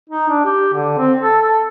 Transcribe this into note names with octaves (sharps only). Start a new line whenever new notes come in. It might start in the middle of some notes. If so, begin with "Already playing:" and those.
D#4
D4
G4
D3
C4
A4
A4